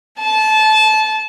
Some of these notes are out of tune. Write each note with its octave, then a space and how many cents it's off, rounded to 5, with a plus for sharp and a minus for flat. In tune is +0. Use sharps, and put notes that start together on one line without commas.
A5 -25